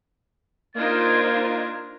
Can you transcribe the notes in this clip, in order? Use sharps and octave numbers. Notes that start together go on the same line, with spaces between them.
A#3 D4 D#4 F4 A#4 C5 G#6